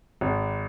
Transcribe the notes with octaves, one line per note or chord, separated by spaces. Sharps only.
G#1